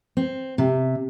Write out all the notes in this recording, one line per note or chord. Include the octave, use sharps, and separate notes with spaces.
C4
C3